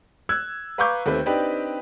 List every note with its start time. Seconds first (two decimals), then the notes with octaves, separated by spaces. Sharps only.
0.29 E6 F#6 G#6
0.78 B4 F5 A#5 C#6 D6 G6
1.06 D#2 A3 C4 B4
1.26 C4 D4 D#4 G4 B4